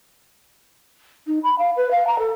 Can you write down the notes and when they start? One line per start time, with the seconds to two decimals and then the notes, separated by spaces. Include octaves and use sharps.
1.27 D#4
1.43 B5
1.58 F5
1.76 B4
1.91 F5
2.07 A#5
2.19 A4